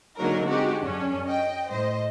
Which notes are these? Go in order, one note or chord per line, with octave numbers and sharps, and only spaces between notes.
D3 F#3 G#3 A#3 D#4 A#4
G#3 C4 D#4 F#4 G4
F#2 C#4 D4
D#5 G5
A2 C5 D#5